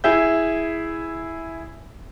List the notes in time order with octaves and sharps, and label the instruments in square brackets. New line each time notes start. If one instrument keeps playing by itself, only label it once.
[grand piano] E4 G#4 E5 G6